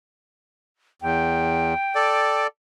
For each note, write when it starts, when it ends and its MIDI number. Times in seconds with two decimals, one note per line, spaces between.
1.02 1.74 40
1.02 2.43 79
1.95 2.47 69
1.95 2.47 74